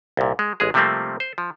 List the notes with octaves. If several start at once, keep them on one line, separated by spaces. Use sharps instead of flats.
C2 A#2
G#3
A1 G#3 G#4
C3 F3 G3 A3 A#3 C4
C5
F3